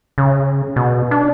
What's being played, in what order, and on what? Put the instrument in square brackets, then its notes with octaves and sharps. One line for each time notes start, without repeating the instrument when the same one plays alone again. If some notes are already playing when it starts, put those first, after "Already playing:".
[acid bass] C#3
B2
D4